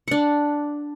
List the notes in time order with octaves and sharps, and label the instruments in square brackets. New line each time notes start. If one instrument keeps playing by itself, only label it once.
[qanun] D4 F#5